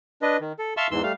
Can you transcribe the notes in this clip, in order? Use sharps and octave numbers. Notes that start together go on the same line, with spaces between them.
D4 B4 D#5
D#3
A4
E5 F5 A5 C6 C#6 E6
E2 G#2 E3 C6 E6
G3 A3 F5